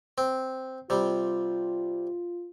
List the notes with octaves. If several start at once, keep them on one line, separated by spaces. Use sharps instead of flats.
C4
C3 G3 F4